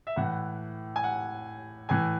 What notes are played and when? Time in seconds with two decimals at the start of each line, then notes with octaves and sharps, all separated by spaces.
0.07 E5
0.16 A2 E3 F#5
0.96 G#5
1.04 F#5
1.89 A2 E3 G#5